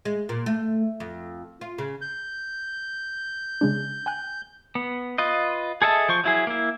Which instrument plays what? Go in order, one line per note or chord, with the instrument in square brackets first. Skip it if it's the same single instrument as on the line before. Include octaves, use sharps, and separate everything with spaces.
[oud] G#3
A#2
A3
F2
F4
C#3
[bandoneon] G6
[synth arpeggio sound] C#3 G#3 D4
G5 G#5 F#6
[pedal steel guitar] B3
F4 B4 D#5
G#4 A4 D#5 E5 A5
F3 C5 C#6
F#3 E4 G#4
A#3 E4